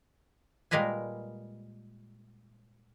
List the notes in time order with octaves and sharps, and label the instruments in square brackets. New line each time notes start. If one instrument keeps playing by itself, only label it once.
[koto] A#2 G3 G#3 A#4 B4 G#5